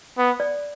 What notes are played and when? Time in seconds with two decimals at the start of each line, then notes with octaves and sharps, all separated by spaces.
0.17 B3
0.40 D5